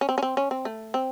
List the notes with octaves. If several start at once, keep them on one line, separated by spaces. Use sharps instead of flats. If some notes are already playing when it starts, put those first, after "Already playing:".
C#4
C4
C#4
C4
C#4
C4
A3
C4